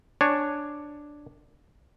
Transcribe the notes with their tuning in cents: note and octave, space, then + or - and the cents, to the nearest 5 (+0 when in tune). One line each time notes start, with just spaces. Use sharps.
D4 +0 C#5 +0 G#5 +0